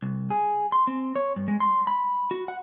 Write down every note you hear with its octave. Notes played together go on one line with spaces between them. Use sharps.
C2
G#4
C6
C4
C#5
G2
G#3
C6
B5
F#4
F#5